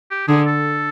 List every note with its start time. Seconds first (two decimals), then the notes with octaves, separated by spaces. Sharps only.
0.11 G4
0.28 D3 G#4
0.47 A4